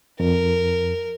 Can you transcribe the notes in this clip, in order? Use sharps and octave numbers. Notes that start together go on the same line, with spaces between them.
F2 A#4